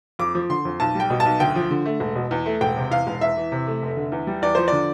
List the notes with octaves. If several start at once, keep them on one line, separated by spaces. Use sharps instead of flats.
F2 D6
F3
D3 C6
F2
B1 A5
G3 G5
B2
A5
B1
D2 G5
F3
D3
A3
E1
B2
E2
A3
E1 G5
C3
E2 F5
E1
E2 E5
E3
C3
A3
F1
D3
E2
G3
E2 D5
F3 C5
D3 D5